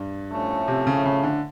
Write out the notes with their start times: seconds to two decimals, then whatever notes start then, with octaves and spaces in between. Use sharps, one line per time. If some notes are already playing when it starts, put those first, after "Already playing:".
Already playing: G2
0.32 A2 F3 A3 C#4
0.68 C3
0.87 C#3
1.05 C#3
1.23 D3